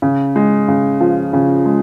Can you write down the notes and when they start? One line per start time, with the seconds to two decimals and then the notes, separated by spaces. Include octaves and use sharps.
0.02 C#3
0.36 G#3
0.68 C#3
1.01 F3
1.33 C#3
1.66 G#3